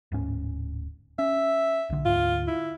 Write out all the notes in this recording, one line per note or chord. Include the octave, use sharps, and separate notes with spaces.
D1 G#2 C#4
C#4 E5
B1 D3
D2 G#2 F4
E4